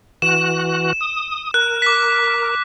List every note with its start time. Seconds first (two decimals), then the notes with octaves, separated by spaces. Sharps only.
0.22 E3 F#4 F#6 E7
1.01 D#6
1.54 A#4 F#6
1.82 D6 B6